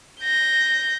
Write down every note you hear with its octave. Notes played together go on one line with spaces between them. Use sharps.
G6 A#6